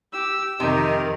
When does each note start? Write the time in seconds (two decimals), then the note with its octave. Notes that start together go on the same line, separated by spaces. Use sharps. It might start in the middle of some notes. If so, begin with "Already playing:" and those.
0.13 G4 E6
0.60 F2 C3 D#3 D#4 G4 A#4